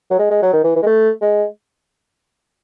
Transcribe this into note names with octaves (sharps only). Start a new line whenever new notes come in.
F#3
G#3
G#3
F#3
D#3
E3
E3
G#3
A3
G#3